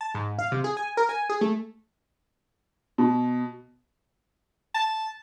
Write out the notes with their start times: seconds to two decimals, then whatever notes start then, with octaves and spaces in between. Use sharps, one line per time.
0.01 A5
0.15 G#2
0.39 F5
0.52 C3
0.64 G#4
0.77 G#5
0.97 A#4
1.09 G#5
1.30 G#4
1.41 A3
2.98 B2
4.74 A5